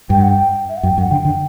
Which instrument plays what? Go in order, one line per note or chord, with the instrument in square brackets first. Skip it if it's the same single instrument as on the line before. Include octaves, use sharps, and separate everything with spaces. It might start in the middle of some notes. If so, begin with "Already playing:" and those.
[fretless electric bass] G2 [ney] G5
[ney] F#5
G5
E5
F#5
[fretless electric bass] F#2 [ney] G5
[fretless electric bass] F#2 [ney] F#5
[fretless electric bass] D3 [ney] G5
[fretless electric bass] D3